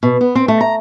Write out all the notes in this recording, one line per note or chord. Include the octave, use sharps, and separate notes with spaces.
B2
B3
C4
A3
A#5